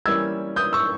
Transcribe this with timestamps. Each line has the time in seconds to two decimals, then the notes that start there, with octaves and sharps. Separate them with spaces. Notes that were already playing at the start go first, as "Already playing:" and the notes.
0.06 E3 G3 A#3 C#4 E6 G#6
0.56 D#6 G6
0.73 C#6 E6